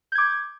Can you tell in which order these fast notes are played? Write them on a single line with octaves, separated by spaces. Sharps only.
G6 G#6 D6